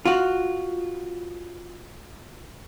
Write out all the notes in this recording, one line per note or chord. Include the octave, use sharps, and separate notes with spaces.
F4 F#4